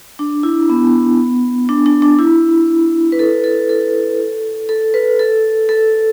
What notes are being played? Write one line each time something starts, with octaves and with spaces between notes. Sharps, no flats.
D4
E4
B3
D4
D4
D4
E4
B4
A4
A4
A4
A4
B4
A4
A4